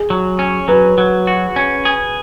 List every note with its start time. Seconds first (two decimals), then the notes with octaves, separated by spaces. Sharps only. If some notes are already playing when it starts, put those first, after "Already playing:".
Already playing: G#4
0.10 F#3
0.39 C#4
0.68 F#3 B4
0.98 F#3
1.27 F#4
1.56 C#4
1.85 G#4